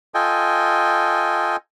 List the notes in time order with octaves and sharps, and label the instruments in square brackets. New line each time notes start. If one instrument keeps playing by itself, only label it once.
[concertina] F4 A4 D#5 G5 G#5